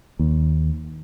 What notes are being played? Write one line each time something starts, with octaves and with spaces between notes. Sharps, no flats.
D#2